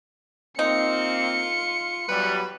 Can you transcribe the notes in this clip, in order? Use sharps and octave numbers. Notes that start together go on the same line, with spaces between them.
A#3 C4 D#4 F4 C#7
E2 F#3 G3 B4